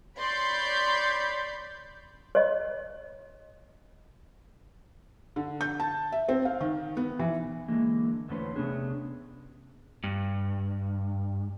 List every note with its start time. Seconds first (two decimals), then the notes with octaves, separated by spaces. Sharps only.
0.18 C#5 D5 B5 C6 G6
2.35 C#5 D#5
5.36 D3
5.61 G6
5.80 A5
6.12 E5
6.29 C4
6.45 F5
6.61 D#3
6.97 B3
7.19 E3
7.68 D3 E3 G#3 A#3
8.28 E2 D3 A3 C#4 B4 C5
8.55 C3 A3 B3 C#4 D4 G#4
10.04 G2